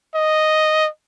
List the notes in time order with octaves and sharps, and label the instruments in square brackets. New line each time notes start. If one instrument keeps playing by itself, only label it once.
[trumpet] D#5